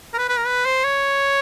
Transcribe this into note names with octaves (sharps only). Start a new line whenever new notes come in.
A#4
B4
B4
A#4
B4
C5
C#5